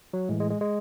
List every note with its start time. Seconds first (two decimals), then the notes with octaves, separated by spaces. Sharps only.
0.13 F#3
0.29 A2 E3 G#3
0.40 G#3
0.50 G#3
0.61 G#3